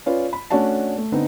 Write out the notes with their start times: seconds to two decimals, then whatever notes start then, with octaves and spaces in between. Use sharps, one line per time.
0.06 C#4 F4 B4 D5
0.33 B5
0.51 A3 C#4 D4 F#4 D5 A5
0.98 A3
1.12 D3 B3 C4 D#4